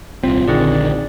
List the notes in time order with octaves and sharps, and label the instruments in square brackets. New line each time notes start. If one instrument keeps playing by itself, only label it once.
[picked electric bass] D#1 C2 C4 [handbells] F4
[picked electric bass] A#1 D3 D#3 [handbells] C4 G#4 D5